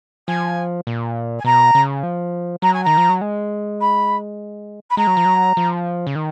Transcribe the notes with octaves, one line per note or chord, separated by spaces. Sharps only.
F3 G#5
A#2
G#5
B2 A#5
C#3
F3
F#3 A#5
G#5
D#3 A#5
F3
F#3
G#3
B5
B5
G#3 A#5
F#3
F3
F#3
F3
C#3
D#3